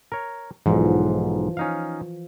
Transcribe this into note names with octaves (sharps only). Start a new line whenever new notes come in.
A#4 C#5
B1 G#2 E3 F3
C#4 D#4 F5